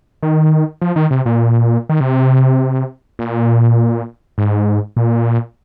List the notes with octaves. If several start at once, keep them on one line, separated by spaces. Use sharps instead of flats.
D#3
F3
D#3
C3
A#2
D#3
C3
A#2
G#2
A#2